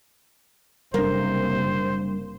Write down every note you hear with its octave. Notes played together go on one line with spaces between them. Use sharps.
F#1 C3 G3 A#3 D4 C5